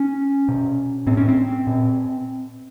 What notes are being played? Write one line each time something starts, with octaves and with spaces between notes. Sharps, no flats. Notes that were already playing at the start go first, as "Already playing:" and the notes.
Already playing: C#4
B2
A2 C4
C#4
C4
A#2